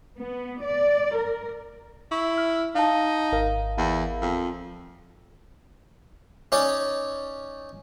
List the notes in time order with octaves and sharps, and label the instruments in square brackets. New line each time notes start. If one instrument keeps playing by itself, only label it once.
[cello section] B3
D5
A#4
[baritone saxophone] E4 [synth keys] C#6
[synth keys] F6
[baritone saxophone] D#4 [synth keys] F5 A5
[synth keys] G#1 A#4 F5
[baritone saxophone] E2
F2
[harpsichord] C#4 D#4 C#5 D5